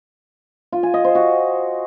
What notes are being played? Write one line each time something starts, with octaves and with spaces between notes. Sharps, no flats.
F4
G#5
D#5
C5
F#4